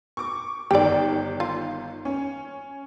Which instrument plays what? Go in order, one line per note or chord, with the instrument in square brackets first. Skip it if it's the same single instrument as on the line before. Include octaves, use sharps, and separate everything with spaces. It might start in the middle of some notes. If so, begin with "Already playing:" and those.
[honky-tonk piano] C#6 D6
[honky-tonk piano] G1 D#3 D7 [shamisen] G4 D5
[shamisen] F4
[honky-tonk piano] C#4